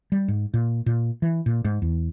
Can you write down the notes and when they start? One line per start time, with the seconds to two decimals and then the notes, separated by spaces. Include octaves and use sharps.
0.12 G3
0.28 G#2
0.54 A#2
0.86 A#2
1.22 E3
1.46 A#2
1.65 G#2
1.82 E2